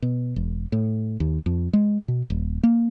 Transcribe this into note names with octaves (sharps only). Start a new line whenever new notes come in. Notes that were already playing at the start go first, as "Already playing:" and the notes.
B2
E1
A2
D#2
F2
G#3
B2
D#1
A#3